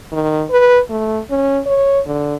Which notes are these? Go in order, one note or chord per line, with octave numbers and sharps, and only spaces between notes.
D#3
B4
A3
C#4
C#5
D3